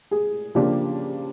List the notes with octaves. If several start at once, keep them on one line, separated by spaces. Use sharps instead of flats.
G#4
C#3 F3 A#3 D4 G4